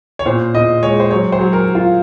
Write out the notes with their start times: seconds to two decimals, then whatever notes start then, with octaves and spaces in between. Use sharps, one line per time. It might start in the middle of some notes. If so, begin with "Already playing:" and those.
0.19 C#5
0.26 A#2 C5
0.54 A#2 D#5
0.83 G#3 C#5
1.00 C5
1.11 F#3 C#5
1.32 C5
1.39 F#3
1.53 A#4
1.68 F#3
1.75 F4